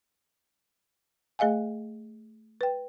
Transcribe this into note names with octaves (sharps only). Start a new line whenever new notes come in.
A3 G#4 D#5 F5 G#5
B4 G5